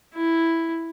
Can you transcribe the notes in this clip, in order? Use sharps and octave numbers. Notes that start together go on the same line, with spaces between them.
E4